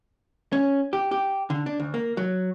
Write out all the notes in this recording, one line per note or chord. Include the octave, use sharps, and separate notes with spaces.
C#4
G4
G4
D3
D4
D2
A#3
F#3